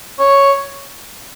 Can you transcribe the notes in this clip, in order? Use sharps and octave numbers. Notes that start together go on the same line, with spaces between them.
C#5